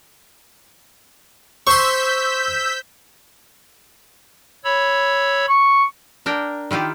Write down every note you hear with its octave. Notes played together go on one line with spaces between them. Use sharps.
C5 C6 C#6 E6 G6 B6
C#5 B5 E6
C#6
D4 A#4 G5
D#3 E4 F4 G4